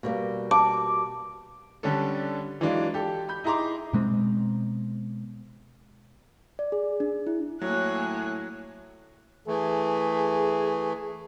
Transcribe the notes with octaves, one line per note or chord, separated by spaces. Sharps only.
B2 G3 A#3
A5 D6
D3 G3 C#4 D4 A4
E3 F#3 G#3 D4 F4
G4 A4
B5 G6
D#4 E4 G#4 A#5 C6 D6
B2 G#3 A#3 C4
D5
G#4
D4
E4
A2 F#3 A#3 C#5 G#5 F#6
E3 A3 G#4